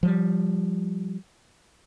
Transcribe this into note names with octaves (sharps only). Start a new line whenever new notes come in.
F3 G3